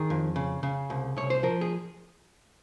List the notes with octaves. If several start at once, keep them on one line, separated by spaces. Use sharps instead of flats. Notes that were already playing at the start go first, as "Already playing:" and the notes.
Already playing: D#3 G#4
F2
C#3
C#3
C2
C2 C#5
C5
F3 A#4
G#4